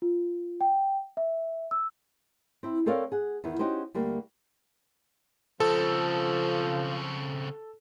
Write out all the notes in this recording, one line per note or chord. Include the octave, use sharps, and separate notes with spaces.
F4
G5
E5
E6
C4 E4
C4 A4 A#4 C#5 D5 F5
G#4 F#5
E2 D#3 E3 B3 E4
C#4 D#4 F#4 G4 C5
D2 G3 A#3
C#3 F3 C4 A4